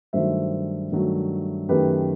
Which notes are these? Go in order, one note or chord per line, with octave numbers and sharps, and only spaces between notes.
G2 D#3 F#3 A3 C5 E5
G2 D#3 F#3 A3
F#2 D#3 A3 G4 B4